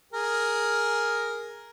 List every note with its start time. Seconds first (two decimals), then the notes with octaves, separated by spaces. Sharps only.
0.13 G#4 A#4